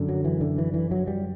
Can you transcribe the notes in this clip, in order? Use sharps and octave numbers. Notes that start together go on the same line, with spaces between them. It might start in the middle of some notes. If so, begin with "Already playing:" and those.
Already playing: F#2 D3
F#3
E3
D3
E3
E3
F#3
G3